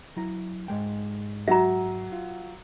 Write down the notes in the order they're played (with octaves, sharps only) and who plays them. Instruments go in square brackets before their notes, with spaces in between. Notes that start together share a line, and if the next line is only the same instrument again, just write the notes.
[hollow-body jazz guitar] F#3 E4 A#5
G#2 G#3 G5
[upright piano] F#3 [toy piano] E5 A#5
[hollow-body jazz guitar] F4